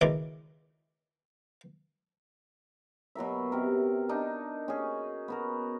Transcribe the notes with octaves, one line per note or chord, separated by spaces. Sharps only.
C#2 B2 D#3 E3 D6
B2 F#3 A#4 E5
C3 A#4
D4 D#4
C#4 F#4 G#4
B3 F#4 A#4